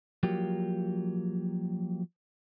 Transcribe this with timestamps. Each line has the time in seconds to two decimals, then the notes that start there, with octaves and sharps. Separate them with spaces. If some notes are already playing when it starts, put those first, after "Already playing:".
0.23 F3 F#3 A#3 G4